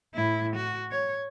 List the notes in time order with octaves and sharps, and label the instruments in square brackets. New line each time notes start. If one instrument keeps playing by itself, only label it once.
[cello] A2 E4
F#4
C#5